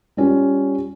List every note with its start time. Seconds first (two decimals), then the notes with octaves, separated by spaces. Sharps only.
0.17 G3 C#4 F4